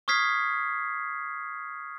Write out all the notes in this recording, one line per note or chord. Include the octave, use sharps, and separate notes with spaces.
C#6 D#6 F6 G#6 B6 C7